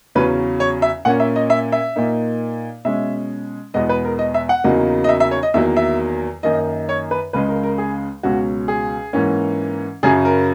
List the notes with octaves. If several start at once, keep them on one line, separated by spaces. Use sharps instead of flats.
E2 C#3 F#3 C#4 B4
C#5
E5
A#2 A#3 C#4 F#5
E5
D#5
E5
E5
A#2 A#3 D#4
B2 G#3 C#4 E5
E2 B2 G#3 B3 D#5
B4
A#4
D#5
E5
F#5
E2 C#3 F#3 A#3 D#4
D#5
E5
E5
C#5
D#5
E2 D#3 F#3 A#3 E5
E5
F#2 D#3 A#3 D#4 D#5
C#5
B4
C#2 C#3 G#3 B4
A#4
A#4
G#4
C#2 B2 F#3 C#4 F#4
G#4
G#2 E3 A#3 C#4
F#2 C#3 F#3 C#4 G#4
A#4